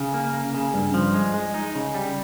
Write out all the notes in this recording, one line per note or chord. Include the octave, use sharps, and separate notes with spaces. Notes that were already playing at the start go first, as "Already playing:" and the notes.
Already playing: C#3
A#3
A#3
C#3
G2
F3
G#3
G#3
D#4
C#3
G3